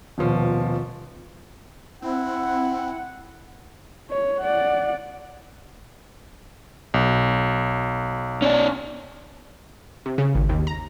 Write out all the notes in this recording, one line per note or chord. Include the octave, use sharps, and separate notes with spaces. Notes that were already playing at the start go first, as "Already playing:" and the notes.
D#1 B2 F3
C4 E4 F#5
C#5
D5 F#5
B1
C#4 D5
C3
C#3
G#1
D#2
A#5